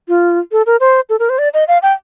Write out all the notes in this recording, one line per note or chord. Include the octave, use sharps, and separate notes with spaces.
F4
A4
A#4
C5
A4
A#4
C5
D5
D#5
F5
G5